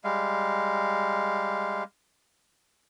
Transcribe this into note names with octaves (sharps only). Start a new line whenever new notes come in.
G3 G#3 F5